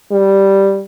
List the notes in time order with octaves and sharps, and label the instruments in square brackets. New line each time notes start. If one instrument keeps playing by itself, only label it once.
[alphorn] G3